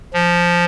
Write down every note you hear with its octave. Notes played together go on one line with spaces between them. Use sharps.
F3